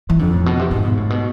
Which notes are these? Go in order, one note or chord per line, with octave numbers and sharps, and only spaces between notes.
E3
F2 D3
A2
B2
C3
G#2 D3
B2
A2
B2